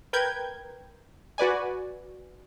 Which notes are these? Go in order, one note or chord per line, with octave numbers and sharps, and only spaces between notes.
A#4 B4 G5 G6 G#6
F#4 B4 D5 G#5